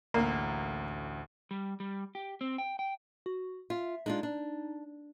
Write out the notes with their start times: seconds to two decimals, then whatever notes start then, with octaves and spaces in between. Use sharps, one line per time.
0.14 A1 D2 A#3 C7
1.51 G3
1.80 G3
2.15 G4
2.41 C4
2.58 G5
2.79 G5
3.26 F#4
3.70 F4 E5
4.06 G#3 D4 D#4 F4
4.23 D4